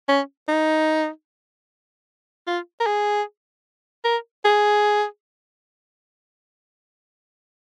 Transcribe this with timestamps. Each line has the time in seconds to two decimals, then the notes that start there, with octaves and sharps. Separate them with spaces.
0.08 C#4
0.48 D#4
2.47 F4
2.80 A#4
2.86 G#4
4.04 A#4
4.45 G#4